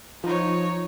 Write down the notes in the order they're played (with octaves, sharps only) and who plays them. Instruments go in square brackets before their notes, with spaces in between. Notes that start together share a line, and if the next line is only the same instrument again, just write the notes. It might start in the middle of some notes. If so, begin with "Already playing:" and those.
[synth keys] F3 [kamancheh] D#4 C#5